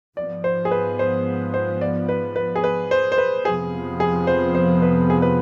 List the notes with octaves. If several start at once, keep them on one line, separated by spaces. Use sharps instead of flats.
G#2 F3 B3 D5
C5
G#4
B4
C5
C5
D5
B4
B4
G#4
B4
C5
C5
B4
F2 C3 F3 B3 G#4
G#4
C5
C5
B4
G#4
B4